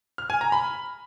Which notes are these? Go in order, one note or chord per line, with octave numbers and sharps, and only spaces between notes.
F6
G#5
A#5
B5